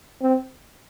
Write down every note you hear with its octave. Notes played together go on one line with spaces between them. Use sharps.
C4